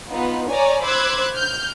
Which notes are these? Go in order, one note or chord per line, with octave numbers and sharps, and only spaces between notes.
B3 D#4 F4 B4
C#5 D5 G#5 A#5
C5 B5 D6 E6 F#6 G#6
F6 G6